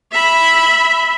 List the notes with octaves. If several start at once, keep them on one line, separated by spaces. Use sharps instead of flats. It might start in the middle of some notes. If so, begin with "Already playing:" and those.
E5 B5